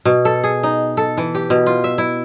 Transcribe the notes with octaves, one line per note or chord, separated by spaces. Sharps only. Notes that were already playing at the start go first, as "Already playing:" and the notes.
B2
A4
G#4
D#4
A4
E3
G4
B2
F4
E5
E4